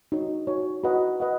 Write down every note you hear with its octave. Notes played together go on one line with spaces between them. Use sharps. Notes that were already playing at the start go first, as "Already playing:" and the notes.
D#4 F#4 C#5
D#4 F#4 C#5
F#4 B4 D#5 F#5
B4 D#5 F#5